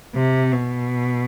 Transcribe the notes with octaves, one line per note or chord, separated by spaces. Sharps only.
C3
B2